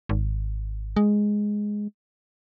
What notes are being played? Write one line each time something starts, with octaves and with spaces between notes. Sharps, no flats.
G#1
G#3